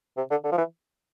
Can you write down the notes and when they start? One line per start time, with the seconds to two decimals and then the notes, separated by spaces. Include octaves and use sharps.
0.17 C3
0.31 D3
0.44 D3
0.52 F3
0.58 E3